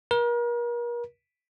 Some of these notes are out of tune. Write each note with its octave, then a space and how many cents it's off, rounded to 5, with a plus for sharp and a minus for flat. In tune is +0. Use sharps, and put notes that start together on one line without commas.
A#4 +40